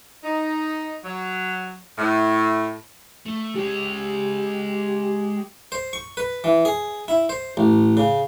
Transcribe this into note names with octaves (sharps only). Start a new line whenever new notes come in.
D#4
F#3
A2
A3
G#3 G4 C#5
C5
C#6
B4
E3
G#4
E4
C5
A1
C#3